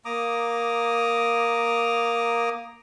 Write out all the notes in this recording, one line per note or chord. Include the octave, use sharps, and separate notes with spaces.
A#3 A#5 D6 D#6